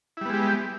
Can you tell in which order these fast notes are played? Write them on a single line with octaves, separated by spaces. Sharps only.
E4 G3 B3 G#3 G4